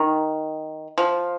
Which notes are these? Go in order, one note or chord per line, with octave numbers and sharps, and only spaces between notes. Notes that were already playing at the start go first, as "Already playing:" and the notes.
Already playing: D#3
F3